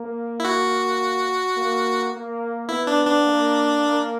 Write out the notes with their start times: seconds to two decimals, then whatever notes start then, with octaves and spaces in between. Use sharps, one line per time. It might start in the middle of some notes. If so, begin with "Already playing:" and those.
Already playing: A#3
0.40 E4
0.45 F#4
1.56 A#3
2.13 A#3
2.69 B3 E4
2.87 D4
3.06 D4
3.25 A#3
3.81 A#3